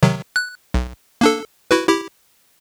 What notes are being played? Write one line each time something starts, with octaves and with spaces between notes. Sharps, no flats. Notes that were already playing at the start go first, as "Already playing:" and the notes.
C3 D#3 F#3
F#6
B1
A#3 D4 A4
E4 F#4 B4
E4 G4